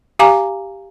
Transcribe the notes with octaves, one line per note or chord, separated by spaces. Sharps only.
G4 F5 G#5 A#5 D6